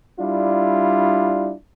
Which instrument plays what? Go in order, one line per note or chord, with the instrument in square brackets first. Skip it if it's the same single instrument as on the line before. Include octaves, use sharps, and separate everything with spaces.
[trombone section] G3 D4 E4 F4